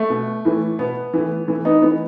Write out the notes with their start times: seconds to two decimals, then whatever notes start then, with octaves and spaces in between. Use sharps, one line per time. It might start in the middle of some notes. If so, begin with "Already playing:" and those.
Already playing: A3
0.10 B2
0.45 A2 E3
0.79 B2 B3
1.14 A2 E3
1.48 A2 E3
1.65 B3 D#4
1.82 A2 E3 B3